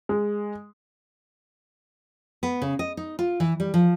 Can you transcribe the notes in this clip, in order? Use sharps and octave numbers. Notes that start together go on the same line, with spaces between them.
G#3
B3
C#3
D#5
D#4
F4
E3
G3
F3